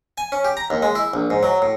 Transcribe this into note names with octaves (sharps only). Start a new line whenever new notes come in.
G#5
C#4
G4
A#5
D#2
G#3
E4
A#1
G#2
F#3
A2